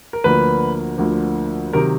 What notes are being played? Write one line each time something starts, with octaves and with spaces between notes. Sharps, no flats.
A#4
D2 D3 F3 A#3 B4
D2 D3 F3 A#3
C3 D#3 F#3 A#4